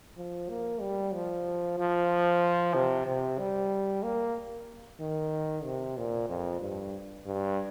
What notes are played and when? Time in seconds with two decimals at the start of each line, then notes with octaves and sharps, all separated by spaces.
0.17 F3
0.49 A#3
0.81 G3
1.14 F3
1.79 F3
2.75 C3
3.06 C3
3.39 G3
4.03 A#3
5.00 D#3
5.65 C3
5.97 A#2
6.29 F2
6.61 G2
7.26 G2